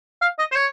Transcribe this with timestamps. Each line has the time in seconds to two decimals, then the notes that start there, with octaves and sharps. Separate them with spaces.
0.22 F5
0.39 D#5
0.52 C5
0.55 C#5